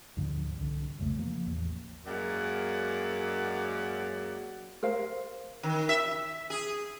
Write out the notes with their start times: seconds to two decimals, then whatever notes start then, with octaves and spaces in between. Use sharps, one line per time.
0.17 D2 G#2 D3 F3
0.57 C2 D3
0.98 C2 F2 C#3 A3
1.19 F3 A#3
1.45 A1 E2
2.06 F#2 F#3 G#3 A#3 D5 F#5
4.83 A#4 C5 F5
5.63 D#3
5.89 E5
6.50 G#4